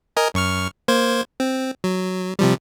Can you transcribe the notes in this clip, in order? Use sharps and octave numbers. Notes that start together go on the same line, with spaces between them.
A#4 D#5 G#5
F#2 C#6 F6
A#3 C5 G#6
C4
F#3
C3 F3 G3